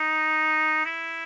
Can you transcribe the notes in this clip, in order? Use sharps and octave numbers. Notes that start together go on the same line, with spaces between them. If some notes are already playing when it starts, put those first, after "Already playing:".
Already playing: D#4
E4